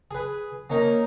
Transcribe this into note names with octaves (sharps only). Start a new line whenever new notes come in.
G#4 B4
A#3 C#4 D#4 A#4